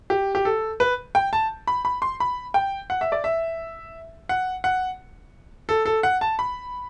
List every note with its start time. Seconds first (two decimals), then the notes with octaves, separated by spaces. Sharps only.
0.10 G4
0.35 G4
0.45 A4
0.80 B4
1.15 G5
1.33 A5
1.67 B5
1.85 B5
2.02 C6
2.20 B5
2.54 G5
2.90 F#5
3.01 E5
3.12 D5
3.24 E5
4.29 F#5
4.64 F#5
5.69 A4
5.86 A4
6.03 F#5
6.21 A5
6.39 B5